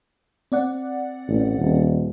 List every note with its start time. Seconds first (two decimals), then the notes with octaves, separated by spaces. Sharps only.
0.52 C4 D5 F#5
1.28 A1
1.58 D#1